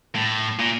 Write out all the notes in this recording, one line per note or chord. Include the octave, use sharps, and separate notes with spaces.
A2
A#2